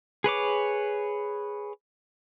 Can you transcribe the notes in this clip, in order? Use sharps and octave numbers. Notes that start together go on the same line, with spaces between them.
G#4 B4 C#5 D6